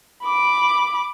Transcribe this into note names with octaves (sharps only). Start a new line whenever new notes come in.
B5 D6